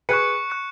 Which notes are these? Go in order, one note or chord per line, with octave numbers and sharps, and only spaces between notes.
G#4 B4 C#6 F#6 C#7
C#6 F#6 C#7